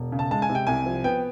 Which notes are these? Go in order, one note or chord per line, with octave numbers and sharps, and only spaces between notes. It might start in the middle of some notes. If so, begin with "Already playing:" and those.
Already playing: E1
C#3
A5
G#3 A5
G#5
C3
G5
C2 G#5
F3
B3 G5